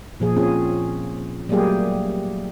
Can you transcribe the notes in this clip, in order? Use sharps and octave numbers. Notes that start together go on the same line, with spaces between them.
A#2 F3 G#4
C4 C#4 F4 G#4
F#3 G3 A3 A#3 G4 G#4